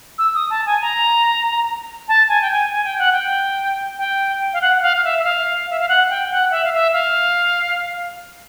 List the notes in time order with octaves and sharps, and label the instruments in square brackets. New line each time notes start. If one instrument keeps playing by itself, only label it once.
[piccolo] E6
D#6
A5
G#5
A#5
A5
G#5
G5
G#5
G#5
G5
F#5
G5
G5
F5
F#5
F#5
F5
F5
E5
E5
F5
E5
F5
F#5
G5
F#5
E5
F5
E5
F5